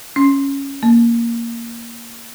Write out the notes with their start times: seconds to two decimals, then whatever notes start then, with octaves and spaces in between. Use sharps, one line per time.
0.16 C#4
0.83 A#3